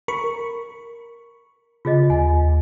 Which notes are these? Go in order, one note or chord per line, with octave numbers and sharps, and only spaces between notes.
A#4 B5 C#6
C#3 F4 G#4 D#5
D#2 G#5